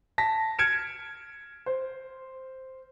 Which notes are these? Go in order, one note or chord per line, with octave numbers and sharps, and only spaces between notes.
A5 A#6 B6
F6 G#6 C#7 D7 E7
C5